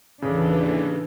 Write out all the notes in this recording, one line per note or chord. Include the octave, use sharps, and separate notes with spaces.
D#2 A2 C#3 E3 D4 A4 B4